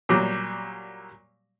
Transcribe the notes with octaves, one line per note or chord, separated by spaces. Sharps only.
A#2 F#3 G3